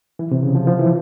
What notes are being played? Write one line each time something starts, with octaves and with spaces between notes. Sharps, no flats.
E3
C3
C#3
F3
F3
E3